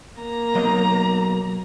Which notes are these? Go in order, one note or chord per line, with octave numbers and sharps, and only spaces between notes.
A#3 A#5
B1 F#3 D#5